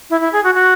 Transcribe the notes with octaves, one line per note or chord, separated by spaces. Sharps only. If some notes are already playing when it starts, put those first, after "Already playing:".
E4
E4
G#4
F#4
F#4